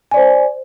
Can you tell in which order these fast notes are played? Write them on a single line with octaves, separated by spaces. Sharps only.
G#5 D5 C5